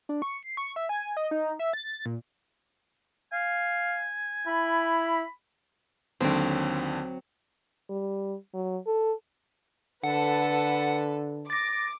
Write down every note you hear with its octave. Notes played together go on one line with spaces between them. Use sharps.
D4
C#6
C7
C#6
E5
G#5
D#5
D#4
E5
A6
A#2
F5 G#5
E4 B5
D#2 D3 F#3 C4
G3
F#3
A4
D3 A4 B4 F#5
D6 A6 A#6